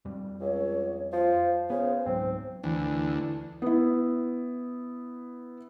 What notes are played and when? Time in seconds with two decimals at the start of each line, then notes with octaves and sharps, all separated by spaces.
0.05 F2 G3
0.40 C#2 C#5
1.13 F3 C5
1.70 C#3 B3 C5
2.06 C#2 G#2 F#3 C4
2.63 D2 E3
3.62 B3 E4